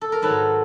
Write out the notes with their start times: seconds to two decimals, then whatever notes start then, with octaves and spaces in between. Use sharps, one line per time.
0.01 A4
0.12 A#4
0.22 G#2 D#3 F#3 A4 B4